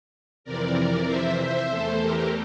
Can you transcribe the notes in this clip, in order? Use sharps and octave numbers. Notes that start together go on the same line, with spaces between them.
F2 C3 E3 A#4 D5
C5 E5
C5 E5
E2 E3 A3 A4 C5
G4 A#4